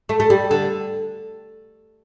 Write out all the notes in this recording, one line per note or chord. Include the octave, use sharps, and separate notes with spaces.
A3
A3
G3
D3